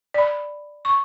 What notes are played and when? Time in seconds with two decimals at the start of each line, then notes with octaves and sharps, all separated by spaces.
0.14 D5 B5
0.85 C#6